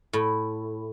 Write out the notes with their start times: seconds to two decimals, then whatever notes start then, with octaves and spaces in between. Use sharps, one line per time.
0.13 A2